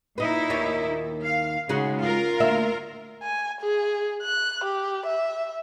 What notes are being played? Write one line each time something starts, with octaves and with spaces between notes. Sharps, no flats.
A#2 D#4 E4 B4 D#5
D#2 D#3 C#5
F5
C#3 G#3 D#4 F#4
F4 A#4
D2 A#3 E5
G#5
G#4
F#6
G4
E5